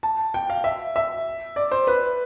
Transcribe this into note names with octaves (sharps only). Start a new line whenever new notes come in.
A5
G5
F5
E5
E5
D5
C5
B4